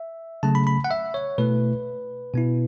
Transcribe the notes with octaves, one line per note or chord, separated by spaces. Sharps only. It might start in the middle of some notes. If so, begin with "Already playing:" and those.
Already playing: E5
C#3 F#3 A3 C#4 A5
B5
B5
F#5
E5
C#5
B2 A3 E4 B4
B2 B3 E4